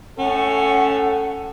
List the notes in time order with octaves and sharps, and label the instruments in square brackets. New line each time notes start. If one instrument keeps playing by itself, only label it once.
[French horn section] A2 A3 A4 [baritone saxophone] C#4 [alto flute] F#5